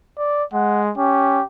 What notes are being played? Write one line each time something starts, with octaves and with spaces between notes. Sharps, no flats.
D5
G#3 F#5
C#4 G4